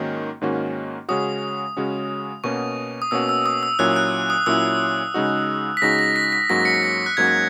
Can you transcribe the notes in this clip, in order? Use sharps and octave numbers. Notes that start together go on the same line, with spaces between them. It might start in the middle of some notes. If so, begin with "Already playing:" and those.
Already playing: G#2 D#3 A#3 C#4 F#4
G#2 D#3 A#3 C#4 F#4
C#3 G#3 C#4 F#4 D#6
C#3 G#3 C#4 F#4
B2 A#3 C#4 F#4 C#6
D#6
B2 A#3 C#4 F#4 E6
E6
D#6
E6
A#2 F#3 C#4 E4 F#6
F#6
D#6
A#2 F#3 C#4 E4 E6
C#3 G#3 D#4 F#4
B6
C#3 G#3 D#4 F#4 A#6
A#6
B6
B6
G#2 F#3 A#3 C#4 F#4 A#6
C#7
B6
A#6
F#6
G#2 F#3 A#3 C#4 F#4 G#6